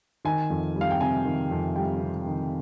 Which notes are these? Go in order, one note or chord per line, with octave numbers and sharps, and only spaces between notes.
D#3 G#5
F2
G3
F5
G5
C3 G#5
D#3
F2
G3 G5
C3
D#3